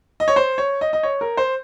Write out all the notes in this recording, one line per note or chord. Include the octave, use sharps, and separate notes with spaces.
D#5
C#5
C5
C#5
D#5
D#5
C#5
A#4
C5